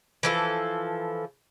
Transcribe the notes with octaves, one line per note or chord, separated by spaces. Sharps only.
E3 F3 A4